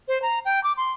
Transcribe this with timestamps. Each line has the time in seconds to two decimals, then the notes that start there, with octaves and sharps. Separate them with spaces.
0.08 C5
0.22 A#5
0.45 G5
0.64 D6
0.77 C6